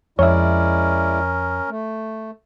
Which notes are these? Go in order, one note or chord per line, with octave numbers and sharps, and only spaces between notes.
F2 G#3 C#4 E4 A#4 C#5 D5 E5
A3